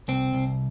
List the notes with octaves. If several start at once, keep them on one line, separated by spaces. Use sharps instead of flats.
C2 C4
C2